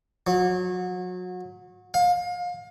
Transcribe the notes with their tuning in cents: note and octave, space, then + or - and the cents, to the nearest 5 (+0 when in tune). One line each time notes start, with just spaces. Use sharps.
F#3 -30
F5 +30